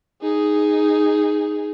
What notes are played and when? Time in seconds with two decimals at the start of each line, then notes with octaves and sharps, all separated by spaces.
0.22 D#4 G#4